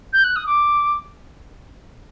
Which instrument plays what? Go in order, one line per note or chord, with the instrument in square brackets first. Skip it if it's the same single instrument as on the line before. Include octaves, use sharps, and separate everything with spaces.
[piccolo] G6
F#6
D#6
D6